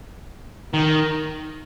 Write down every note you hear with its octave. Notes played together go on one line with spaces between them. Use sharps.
D#3